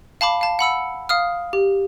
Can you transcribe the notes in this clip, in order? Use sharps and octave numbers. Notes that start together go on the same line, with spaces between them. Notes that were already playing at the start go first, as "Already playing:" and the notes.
F5 A5 B5 D6
F5 A5
F#5 B5 E6 C#7
F5 D#6 F6
G4